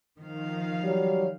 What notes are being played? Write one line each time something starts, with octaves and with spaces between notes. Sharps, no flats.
D#3 F3 F5
F#3 G3 C#5